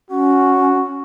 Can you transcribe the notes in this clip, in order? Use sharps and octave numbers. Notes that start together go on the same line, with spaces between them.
C#4 F#4